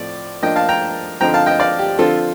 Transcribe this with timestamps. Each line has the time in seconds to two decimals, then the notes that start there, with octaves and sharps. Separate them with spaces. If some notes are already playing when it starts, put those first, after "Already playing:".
Already playing: A2 F3 C4 D5
0.42 F3 A#3 D4 D#5 G5
0.56 F5 A5
0.69 G5 A#5
1.21 D3 F3 C4 D#4 G5 A#5
1.34 F5 A5
1.46 D#5 G5
1.60 D5 F5
1.79 G4
1.98 D3 F3 C4 F4 A4